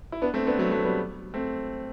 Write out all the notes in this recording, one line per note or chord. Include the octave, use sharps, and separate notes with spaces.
E4
B3 D4
A3 C4
B3 D4
F#3 A3
F#3 A3
G3 B3
A3 C4